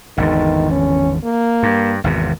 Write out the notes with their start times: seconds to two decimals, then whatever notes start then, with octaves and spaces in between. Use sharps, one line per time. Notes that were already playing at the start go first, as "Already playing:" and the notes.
0.18 G#1 E2 D3 D#3
0.71 C#4
1.24 A#3
1.63 G2
2.04 G#1 E2 C3